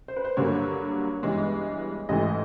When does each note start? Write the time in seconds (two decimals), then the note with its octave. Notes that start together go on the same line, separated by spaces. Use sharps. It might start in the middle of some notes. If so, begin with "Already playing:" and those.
0.08 C5
0.16 B4
0.25 C5
0.37 G2 D3 F#3 A#3 C#5
1.22 G2 E3 G#3 B3
2.09 A1 G#2 E3 A3 D#5